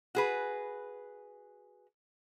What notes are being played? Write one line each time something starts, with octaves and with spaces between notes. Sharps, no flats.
F#4 G#4 B4